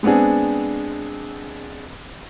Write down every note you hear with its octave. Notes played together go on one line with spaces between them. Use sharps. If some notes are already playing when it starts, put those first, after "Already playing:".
G#3 B3 C4 D4 G#4